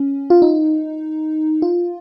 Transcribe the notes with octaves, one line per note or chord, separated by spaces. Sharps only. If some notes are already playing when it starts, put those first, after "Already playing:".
Already playing: C#4
F4
D#4
F4